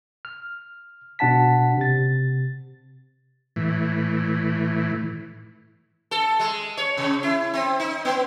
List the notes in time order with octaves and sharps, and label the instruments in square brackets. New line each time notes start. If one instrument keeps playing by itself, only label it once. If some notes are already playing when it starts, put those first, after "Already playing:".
[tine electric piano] F6
B2 D4 F#5 A5 B6
C3 A6
[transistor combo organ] A2 E3
[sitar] A4
G#3
C#5
C3
E4
C4
D#4
B3